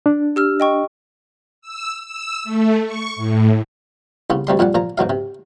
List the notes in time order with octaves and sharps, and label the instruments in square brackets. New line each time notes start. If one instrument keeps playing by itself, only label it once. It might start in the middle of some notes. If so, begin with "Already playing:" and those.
[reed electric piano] D4
[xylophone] G4 E6 F6
D#5 G5 C#6
[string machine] E6
E6
A3
C#6
A2
[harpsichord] C2 C#3 B3 C#4
D2 C3 G3 C6
F2 A#2 G3 F#5
A#2 F3 A#5
G#2 B2 F#3 F5
C3